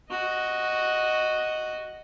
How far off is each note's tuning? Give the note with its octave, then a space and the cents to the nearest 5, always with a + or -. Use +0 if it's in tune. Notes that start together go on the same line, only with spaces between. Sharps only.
F#4 +0 D#5 +0